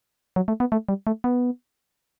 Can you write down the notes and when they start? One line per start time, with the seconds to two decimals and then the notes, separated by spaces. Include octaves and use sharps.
0.36 F#3
0.48 A3
0.60 B3
0.72 A3
0.89 G3
1.07 A3
1.24 B3